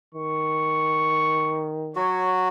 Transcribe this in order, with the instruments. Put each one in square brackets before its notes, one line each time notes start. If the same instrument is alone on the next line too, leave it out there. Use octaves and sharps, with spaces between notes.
[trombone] D#3 [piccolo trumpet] C#6
[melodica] F#3 F#4 [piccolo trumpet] C#5